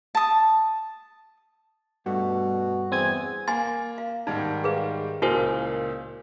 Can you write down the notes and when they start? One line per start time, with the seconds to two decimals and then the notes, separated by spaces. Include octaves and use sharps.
0.15 A5 D#6
2.06 G2 B2 A3 F#4
2.92 E2 C4 G#5 G#6
3.48 A#3 F#5 G#5 C6 A6
3.98 F5
4.27 G#2 D#3 G3 D#4
4.64 G#4 B4 F5
5.22 C#2 A#2 E4 F#4 A#4 C5 G#5